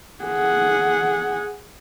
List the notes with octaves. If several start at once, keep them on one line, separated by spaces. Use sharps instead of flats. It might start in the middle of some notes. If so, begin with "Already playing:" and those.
G#4 F#5